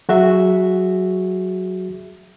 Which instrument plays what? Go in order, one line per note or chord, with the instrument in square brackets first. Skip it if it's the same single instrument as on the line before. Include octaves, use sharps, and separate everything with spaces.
[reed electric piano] F#3 F#4 G#4 E5